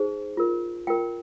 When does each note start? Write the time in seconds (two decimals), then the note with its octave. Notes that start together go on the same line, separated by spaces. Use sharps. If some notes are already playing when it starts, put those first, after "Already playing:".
Already playing: D#4 G#4 C5
0.37 F4 A#4
0.87 F4 A#4 G5